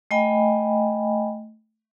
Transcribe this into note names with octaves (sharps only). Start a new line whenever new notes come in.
A3 D#5 G5 G#5 B5